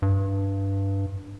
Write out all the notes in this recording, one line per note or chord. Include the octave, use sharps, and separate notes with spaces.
G2